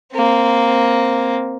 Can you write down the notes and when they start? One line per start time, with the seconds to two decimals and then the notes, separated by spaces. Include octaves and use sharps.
0.13 A#3 C4